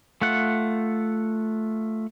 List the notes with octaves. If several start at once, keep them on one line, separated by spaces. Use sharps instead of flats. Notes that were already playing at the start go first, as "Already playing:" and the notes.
A3 F4 F#5